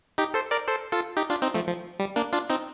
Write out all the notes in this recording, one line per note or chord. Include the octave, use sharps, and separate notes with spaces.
D#4 G4
A4 C5
A#4 D5
A4 C5
F4 A4
D#4 G4
D4 F4
C4 D#4
F3 A3
F3
G3
A#3 D4
D4 F4
C4 D#4